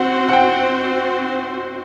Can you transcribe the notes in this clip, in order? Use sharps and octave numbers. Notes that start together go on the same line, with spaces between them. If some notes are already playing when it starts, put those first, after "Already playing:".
Already playing: C4 F#4 C5 F#5
F#5
G5